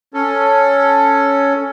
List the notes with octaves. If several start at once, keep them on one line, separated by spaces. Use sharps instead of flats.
C#4 A4